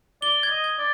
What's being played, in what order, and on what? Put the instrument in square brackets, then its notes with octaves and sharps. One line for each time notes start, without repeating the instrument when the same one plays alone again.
[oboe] D5 [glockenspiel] G7
[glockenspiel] G#6
[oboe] D#5
[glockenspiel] G#6
[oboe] D5